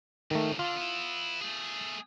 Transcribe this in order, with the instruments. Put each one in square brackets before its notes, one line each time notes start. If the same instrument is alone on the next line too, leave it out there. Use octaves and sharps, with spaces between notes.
[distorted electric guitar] G#2 F3 [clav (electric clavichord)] D#3 A3
[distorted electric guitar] D3 [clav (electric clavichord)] F4
[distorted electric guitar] B3 E4
A3 G#4